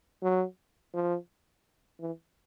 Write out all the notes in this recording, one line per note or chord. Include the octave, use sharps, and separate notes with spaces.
F#3
F3
E3